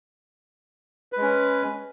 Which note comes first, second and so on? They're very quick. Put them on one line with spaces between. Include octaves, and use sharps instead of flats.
B4 G#3 C#4